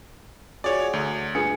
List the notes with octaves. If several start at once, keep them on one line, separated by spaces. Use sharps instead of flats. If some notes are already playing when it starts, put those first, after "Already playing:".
F#4 G#4 C#5 D5
D2
G2 G#4 C#7